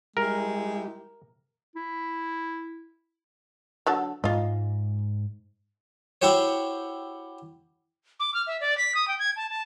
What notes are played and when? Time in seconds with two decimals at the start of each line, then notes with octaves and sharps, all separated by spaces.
0.17 G3 G#3 E4 G4 A#4
1.76 E4
3.86 D3 F#3 A4
4.24 G#2 G#3 F4 D#5
6.22 E4 F#4 G4 C5 C#5
8.20 D6
8.34 F6
8.47 E5
8.61 D5
8.78 B6
8.95 D#6
9.08 G5
9.19 G#6
9.36 A5
9.49 A5